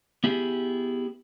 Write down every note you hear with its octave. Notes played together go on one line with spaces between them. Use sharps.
B3 E4 G4 G#4